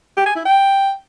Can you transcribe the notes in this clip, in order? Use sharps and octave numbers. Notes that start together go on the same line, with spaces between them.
G4
G#5
E4
G5